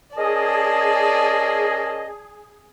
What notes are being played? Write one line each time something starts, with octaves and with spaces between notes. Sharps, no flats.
C#4 G#4 A#4 D5 D#5 A5